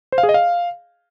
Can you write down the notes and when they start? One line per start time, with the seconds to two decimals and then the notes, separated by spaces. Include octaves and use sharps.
0.12 C5
0.18 F5
0.23 G#4
0.29 D#5
0.34 F5